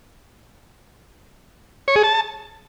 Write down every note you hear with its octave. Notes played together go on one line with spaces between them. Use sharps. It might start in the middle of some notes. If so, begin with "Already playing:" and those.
C#5
G#4
A5